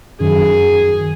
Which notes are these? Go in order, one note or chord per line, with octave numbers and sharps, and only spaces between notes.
F#2 D#3 G#4